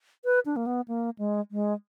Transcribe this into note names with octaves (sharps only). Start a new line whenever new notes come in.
B4
D4
A#3
B3
A#3
G#3
G#3